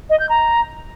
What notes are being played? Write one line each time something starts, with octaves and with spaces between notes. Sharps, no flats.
D#5
G6
A#5